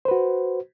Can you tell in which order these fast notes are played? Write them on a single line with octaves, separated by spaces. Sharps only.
C5 B4 F#4